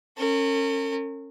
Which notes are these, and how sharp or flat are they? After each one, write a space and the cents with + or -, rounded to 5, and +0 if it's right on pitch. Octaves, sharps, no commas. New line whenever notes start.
C#4 -20 A#4 -40